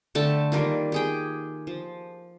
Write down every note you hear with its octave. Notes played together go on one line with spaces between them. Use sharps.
D3 A3 G5 A5
D#3 G3 A#3 F4
G4 G#4 G5
F3